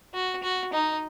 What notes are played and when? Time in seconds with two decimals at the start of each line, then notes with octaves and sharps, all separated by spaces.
0.14 F#4
0.43 F#4
0.73 D#4